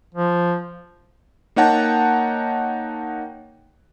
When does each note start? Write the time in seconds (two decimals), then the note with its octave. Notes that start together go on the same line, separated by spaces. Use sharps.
0.14 F3
1.56 A#3 D#4 C#5 F#5 G5 A5